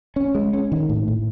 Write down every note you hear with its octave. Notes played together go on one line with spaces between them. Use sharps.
C#4
G#3
C#4
D#3
A2
A2